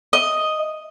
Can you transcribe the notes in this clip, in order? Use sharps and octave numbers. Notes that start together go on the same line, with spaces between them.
D#5